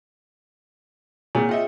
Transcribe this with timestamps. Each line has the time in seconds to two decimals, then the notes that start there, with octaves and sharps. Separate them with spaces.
1.35 A#2 C4 G#4 C#5
1.49 F4 D#5 E5 G5